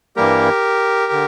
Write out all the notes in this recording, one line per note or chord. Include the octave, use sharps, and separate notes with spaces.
G2 E3 G3 A#3 G4 A#4
D3